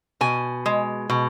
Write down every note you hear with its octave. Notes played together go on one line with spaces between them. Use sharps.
B2 G#5
G#3
B2